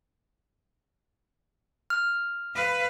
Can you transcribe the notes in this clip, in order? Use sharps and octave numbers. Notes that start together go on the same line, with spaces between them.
F6
B4 F5